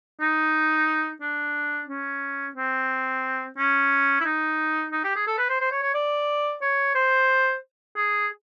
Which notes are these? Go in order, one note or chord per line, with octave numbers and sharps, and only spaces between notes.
D#4
D4
C#4
C4
C#4
E4
D#4
D#4
G4
G#4
A4
B4
C5
C5
C#5
C#5
D5
C#5
C5
G#4